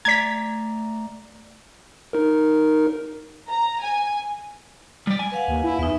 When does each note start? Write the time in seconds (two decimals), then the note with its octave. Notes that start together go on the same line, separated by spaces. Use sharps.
0.05 A3 D5 A#5 G#6 B6
2.13 D#4 A#4
3.49 A#5
3.82 G#5
5.07 G3 D5
5.19 G#5
5.32 B4 F5 F#5
5.48 D#2
5.64 E4
5.79 E2 D#4 B4 E5